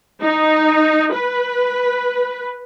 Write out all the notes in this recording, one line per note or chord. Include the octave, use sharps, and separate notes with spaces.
D#4
B4